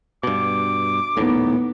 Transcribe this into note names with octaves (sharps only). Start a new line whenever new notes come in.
G2 B2 D6
D#1 A#1 A2 B3 D#4